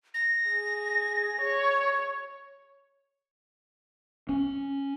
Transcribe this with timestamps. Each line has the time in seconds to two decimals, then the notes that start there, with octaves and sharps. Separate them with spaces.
0.14 A#6
0.49 G#4
1.41 C#5
4.29 C#4